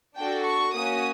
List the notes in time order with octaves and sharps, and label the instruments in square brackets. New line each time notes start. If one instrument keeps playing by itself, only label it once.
[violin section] D4 F#4 A4 G5
C#6
A#3 C#4 F#4 D#6